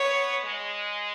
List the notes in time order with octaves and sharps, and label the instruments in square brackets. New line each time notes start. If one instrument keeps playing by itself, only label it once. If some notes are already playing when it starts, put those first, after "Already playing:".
Already playing: [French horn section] B3 [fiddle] C#5
[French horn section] G#3